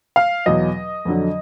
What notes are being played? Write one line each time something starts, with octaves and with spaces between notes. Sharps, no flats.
F5
E2 B2 F#3 D#5
F2 D3 F#3